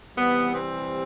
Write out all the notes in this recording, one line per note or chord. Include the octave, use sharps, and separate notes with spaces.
C3 E3 G3 B3
C4